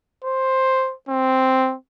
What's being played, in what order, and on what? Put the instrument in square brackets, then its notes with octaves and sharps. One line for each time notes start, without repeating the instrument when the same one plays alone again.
[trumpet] C5
C4